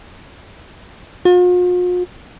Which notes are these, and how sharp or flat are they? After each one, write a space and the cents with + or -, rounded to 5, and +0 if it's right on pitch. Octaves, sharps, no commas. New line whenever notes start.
F4 +45